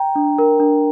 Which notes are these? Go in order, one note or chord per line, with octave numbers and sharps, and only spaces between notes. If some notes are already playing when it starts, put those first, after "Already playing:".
Already playing: G5 A#5
D4
A#4
D4